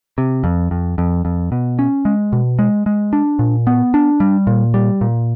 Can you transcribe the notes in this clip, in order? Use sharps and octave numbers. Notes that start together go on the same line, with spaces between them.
C3
F2
F2
F2
F2
B2
C#4
G#3
B2
G#3
G#3
D4
A#2
B3
D4
G3
A#2
G3
A#2